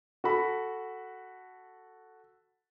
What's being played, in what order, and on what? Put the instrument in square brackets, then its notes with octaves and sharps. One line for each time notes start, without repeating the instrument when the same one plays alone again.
[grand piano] F#4 A4 B5